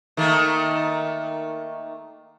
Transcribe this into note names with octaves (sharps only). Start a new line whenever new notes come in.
D#3 A3 A#3